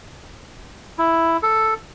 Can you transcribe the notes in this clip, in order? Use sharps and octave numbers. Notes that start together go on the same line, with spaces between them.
E4
A4